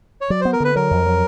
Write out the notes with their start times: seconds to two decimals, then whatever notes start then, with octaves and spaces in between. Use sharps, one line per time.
0.21 C#5
0.30 F#3 D5
0.41 B3 C5
0.53 A#4
0.60 D3 B4
0.76 F#3 A#4
0.91 F2
1.06 F#3